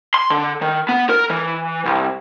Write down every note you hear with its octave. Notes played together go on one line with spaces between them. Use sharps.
C6
D3
D#3
B3
A#4
E3
C2